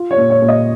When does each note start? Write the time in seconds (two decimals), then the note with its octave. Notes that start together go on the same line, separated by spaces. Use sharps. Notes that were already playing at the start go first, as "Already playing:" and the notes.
Already playing: F4
0.11 C#5
0.18 A#2
0.30 C#5
0.42 A#2
0.48 D#5